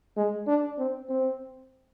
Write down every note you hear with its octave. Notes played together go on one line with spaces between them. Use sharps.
G#3
D4
C4
C4